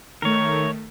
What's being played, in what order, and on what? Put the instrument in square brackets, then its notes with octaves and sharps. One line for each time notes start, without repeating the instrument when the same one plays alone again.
[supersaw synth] D#3 A3 [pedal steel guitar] A#4 C#5